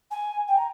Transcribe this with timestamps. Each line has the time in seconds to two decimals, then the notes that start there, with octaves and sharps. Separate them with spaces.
0.10 G#5
0.47 G5
0.57 A#5